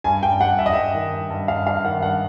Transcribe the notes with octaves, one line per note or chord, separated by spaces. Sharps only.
G2 G#5
G2 G5
G2 F#5
G2 E5
D#5
G2 E5
D#3
G2
G2
G2 F5
G2 F5
D#3 F#5
G2 F#5